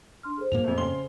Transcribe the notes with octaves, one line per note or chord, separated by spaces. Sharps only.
D4 C6 F6
G#4 A4 C5
G2 A#2 A#3 F7
F2 A3
C#3 C6 G7